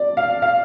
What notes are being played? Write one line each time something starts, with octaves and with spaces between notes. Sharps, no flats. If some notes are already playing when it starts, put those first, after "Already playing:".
Already playing: D5
F5
F5